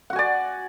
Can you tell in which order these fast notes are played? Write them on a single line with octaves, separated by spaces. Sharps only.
F#5 F#4 G#5 D5